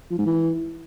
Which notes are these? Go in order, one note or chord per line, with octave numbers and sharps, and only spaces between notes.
F3
G#2
E3